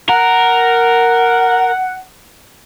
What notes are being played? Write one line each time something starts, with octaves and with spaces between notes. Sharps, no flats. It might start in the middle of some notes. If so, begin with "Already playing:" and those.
A#4 F#5